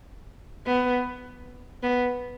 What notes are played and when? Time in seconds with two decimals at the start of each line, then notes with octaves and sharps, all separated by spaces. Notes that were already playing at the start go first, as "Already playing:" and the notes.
0.67 B3
1.83 B3